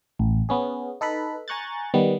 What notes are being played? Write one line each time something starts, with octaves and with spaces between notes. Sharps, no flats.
A1
B3 C#4 G#4
D#4 A4 B4 B5
G#5 A#5 C#6 F#6 G6 A6
D#3 G3 B3